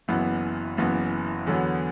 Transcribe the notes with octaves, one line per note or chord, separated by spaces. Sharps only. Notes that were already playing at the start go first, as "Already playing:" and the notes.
F#1 F#2 E3 B3
F#1 F#2 E3 B3
E2 D3 F#3 B3